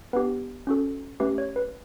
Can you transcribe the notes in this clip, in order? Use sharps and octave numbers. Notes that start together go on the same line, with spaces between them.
B3 D4 G4 B4
C#4 F#4 A4
A3 C#4 G4 B4
C#5
B4